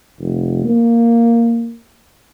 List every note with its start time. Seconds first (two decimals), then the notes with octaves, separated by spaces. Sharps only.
0.20 F1
0.64 A#3